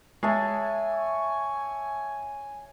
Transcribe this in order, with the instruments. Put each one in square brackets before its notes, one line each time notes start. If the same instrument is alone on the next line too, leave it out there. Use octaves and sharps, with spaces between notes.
[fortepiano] G#3 [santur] C#5 E5 A5 [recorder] G#5
[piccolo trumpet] C#6